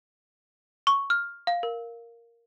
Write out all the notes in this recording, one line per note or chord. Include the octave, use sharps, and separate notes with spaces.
C#6
F6
F5
A#4